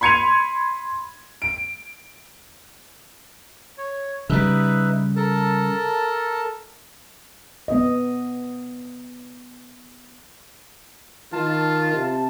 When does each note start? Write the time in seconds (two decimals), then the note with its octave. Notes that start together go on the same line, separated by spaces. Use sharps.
0.01 B5 C6 G#6 C#7 D#7 F7
1.42 D7
3.78 C#5
4.30 C#3 G3 D#4 B4 E5
5.16 A4 A#4 A5
7.68 B3 D#5
11.33 D#3 F4 A5
11.94 C3